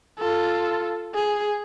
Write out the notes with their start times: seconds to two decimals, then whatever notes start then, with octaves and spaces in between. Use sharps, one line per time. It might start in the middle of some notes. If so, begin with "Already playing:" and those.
0.18 F4 A4
1.15 G#4